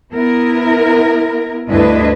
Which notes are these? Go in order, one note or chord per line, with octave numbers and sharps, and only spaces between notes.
B3 E4 A#4
D2 G2 D4 E4 B4 D#5